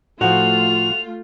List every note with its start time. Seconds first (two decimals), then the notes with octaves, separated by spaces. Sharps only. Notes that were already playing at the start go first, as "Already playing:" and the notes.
0.21 A2 F3 A3 F4 F#4 F7